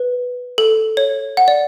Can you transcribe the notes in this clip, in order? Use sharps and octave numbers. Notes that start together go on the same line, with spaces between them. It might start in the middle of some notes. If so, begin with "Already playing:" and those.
Already playing: B4
A4
C#5
F#5
D5